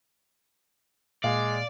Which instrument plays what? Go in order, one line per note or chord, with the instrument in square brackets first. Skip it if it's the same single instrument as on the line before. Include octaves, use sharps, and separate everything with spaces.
[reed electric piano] A#2 [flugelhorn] G#3 [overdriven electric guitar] D5 [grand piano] F5